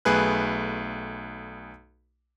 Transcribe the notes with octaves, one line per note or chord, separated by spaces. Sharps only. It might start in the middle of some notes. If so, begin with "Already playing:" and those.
B1 A3 G#4 B4 F#6